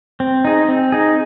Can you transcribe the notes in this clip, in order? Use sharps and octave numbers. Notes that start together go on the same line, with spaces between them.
C4
D#4 G#4
C4
D#4 G#4